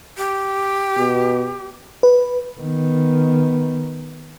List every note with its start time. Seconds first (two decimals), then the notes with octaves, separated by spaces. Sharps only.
0.17 G4
0.97 B2
2.03 B4
2.60 D#3 B3